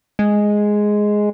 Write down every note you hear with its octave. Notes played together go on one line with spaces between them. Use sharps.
G#3